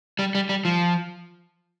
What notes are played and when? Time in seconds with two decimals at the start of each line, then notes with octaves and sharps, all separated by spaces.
0.19 G3
0.35 G3
0.49 G3
0.65 F3